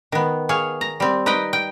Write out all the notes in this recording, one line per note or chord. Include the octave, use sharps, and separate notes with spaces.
D#3 B3
G#4 C#5 F5
A#5
G3 C4
D#4 B4 D#5 G5
G5